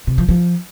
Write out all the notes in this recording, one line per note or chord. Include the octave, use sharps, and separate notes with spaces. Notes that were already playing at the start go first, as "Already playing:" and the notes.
C3
F3
F3